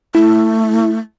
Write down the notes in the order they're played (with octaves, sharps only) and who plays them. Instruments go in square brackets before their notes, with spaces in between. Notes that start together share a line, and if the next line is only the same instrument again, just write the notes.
[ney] A3 [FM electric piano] E4